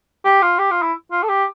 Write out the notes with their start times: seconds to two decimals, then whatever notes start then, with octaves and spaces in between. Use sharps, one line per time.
0.25 G4
0.42 F4
0.59 G4
0.71 F4
0.82 E4
1.12 F4
1.23 A4
1.29 G4